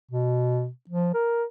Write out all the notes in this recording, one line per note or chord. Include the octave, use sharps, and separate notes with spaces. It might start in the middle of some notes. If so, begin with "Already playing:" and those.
B2
F3
A#4